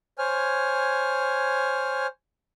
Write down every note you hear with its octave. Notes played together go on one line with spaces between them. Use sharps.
C5 C#5 G#5 F6